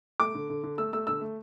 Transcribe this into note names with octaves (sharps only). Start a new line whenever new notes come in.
A3 D6
D3
D3
D3
A3 E6
A3 E6
D3 E6
A3